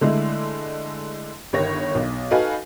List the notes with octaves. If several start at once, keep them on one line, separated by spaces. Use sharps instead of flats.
D3 G#3 A3 E4
G1 D#3 C#5 A#6
B1
D#4 F#4 A4 B4 F5 G#5